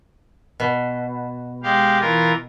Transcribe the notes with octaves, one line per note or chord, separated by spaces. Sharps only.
B2
G#3 G4 F5
E3 F4 A#4